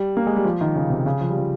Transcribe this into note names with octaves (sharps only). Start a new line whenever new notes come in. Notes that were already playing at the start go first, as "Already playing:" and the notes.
Already playing: G3
A#3
G#3
G3
F3
D#3
C#3
C3
C#3
F3
G3
F3